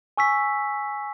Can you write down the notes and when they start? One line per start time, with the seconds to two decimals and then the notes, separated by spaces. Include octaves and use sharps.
0.17 G#5 C#6 E6 B6